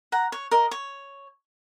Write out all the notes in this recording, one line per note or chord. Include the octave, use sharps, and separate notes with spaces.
F#5 A#5
C#5
A#4 D#5
C#5